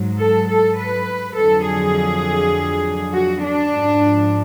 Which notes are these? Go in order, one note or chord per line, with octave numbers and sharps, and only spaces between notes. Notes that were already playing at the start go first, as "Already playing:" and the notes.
Already playing: G#2 F#3
A4
A4
B4
F2 D3 F#3 A4
G#4
F#4
D4
G#2 F3